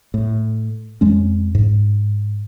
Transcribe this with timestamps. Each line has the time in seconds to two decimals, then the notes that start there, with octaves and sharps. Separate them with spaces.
0.14 A2
1.01 F2 G#3 C#4
1.55 G#2